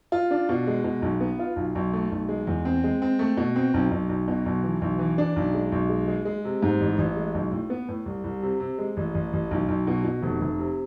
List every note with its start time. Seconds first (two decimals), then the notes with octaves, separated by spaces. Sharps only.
0.12 F4
0.31 D4
0.49 B2
0.67 G#3
0.84 B2
1.02 B1
1.20 B3
1.39 F4
1.56 B1
1.75 B1
1.93 A3
2.11 B1
2.29 G#3
2.47 E2
2.65 C4
2.84 G#3
3.02 C4
3.19 A3
3.37 B2
3.56 C4
3.74 B1
3.91 B1
4.09 B1
4.28 B2
4.46 B1
4.64 E3
4.81 B1
4.99 E3
5.18 D4
5.36 B1
5.54 G#3
5.72 B1
5.89 G#3
6.08 G#3
6.25 G#3
6.44 C3
6.63 G#2
6.80 A1
6.98 A1
7.17 G#3
7.34 B1
7.52 A2
7.70 B3
7.89 A2
8.06 C2
8.24 C2
8.42 C3
8.60 C3
8.79 G#3
8.97 A1
9.15 A1
9.33 A1
9.51 B1
9.68 B1
9.87 B2
10.04 B2
10.22 F1
10.41 F1
10.58 C3